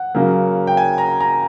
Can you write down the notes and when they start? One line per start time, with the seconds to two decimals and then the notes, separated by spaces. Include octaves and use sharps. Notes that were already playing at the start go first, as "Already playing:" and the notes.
Already playing: F#5
0.15 C#3 F#3 A#3
0.67 G5
0.77 G#5
0.98 A#5
1.20 A#5